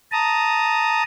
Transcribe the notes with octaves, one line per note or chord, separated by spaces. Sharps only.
A5 A#5 D#6